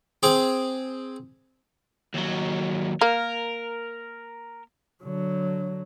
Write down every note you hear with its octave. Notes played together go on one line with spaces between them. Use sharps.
C4 G#4 D6
D#2 F#3
A#3 A#4
D3 F#3